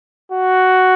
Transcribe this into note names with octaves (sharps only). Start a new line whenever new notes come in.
F#4